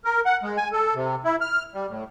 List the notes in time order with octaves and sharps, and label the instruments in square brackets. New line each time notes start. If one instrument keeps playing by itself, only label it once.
[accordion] A#4
F#5
G#3
G#5
A4
C3
E4
F6
G3
A2